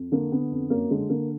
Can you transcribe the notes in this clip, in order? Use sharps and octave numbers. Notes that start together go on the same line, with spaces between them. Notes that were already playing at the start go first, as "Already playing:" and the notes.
Already playing: F2
D3 A#3
D3 B3
F2
F#2 A#3
D3 G#3
D3 A#3